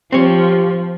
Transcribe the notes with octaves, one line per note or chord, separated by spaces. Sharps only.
F3 C4 G4 C#5